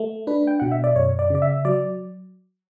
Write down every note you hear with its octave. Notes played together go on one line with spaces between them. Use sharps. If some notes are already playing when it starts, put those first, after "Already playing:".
Already playing: A3
D4 B4
G5
B2 F#5
E5
D5
F#2 C#5
D5
C#3 D5
E5
F#3 D5